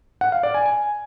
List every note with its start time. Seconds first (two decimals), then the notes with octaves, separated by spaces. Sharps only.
0.21 F#5
0.32 F5
0.43 D5
0.54 G#5
0.66 G#5